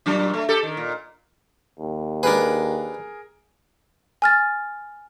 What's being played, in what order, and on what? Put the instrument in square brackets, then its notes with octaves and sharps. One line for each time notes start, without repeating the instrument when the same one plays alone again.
[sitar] A#2 F#3 D4
A3
G4 A4
D#3
A#2
[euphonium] D#2
[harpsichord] D4 B4 [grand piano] G#4 A#4
[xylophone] G#5 F6 A6